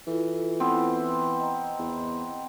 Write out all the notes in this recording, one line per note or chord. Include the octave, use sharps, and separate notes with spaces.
E3 E4 F4 A4
B3 C4
D#5 A#5
E2